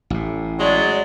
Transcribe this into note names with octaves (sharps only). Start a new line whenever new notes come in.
A1 A2
F#3 G#3 D5